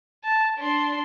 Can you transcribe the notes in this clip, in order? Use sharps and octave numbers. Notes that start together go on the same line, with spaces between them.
A5
D4 C6